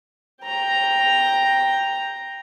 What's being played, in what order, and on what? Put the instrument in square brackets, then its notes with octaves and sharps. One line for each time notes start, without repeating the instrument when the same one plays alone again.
[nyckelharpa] G5 A#5